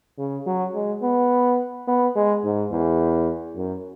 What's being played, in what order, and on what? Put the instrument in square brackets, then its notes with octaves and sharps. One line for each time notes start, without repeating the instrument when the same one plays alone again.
[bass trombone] C#3
F#3
G#3
B3
B3
G#3
G#2
E2
F#2